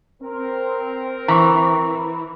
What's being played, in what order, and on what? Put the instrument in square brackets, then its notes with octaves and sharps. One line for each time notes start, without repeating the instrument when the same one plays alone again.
[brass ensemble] C4 A#4
[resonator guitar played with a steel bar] E3 [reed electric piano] A#5 C#6